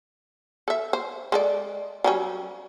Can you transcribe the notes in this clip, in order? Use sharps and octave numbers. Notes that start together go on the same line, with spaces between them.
A4 E5
C5
G#3 A4 D5
F#3 G3 C#4